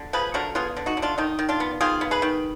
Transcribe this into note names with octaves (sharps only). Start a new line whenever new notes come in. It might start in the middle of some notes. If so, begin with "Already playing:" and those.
Already playing: D3
F3 G#4 B4
D3 F#4 A#4
B3 F4 G#4
D3
D#4 F#4
D3
D4 F4
D#3 D#4
D#3
D4 F4
B3
D#3 F4 G#4
B3
G#4 B4
D#3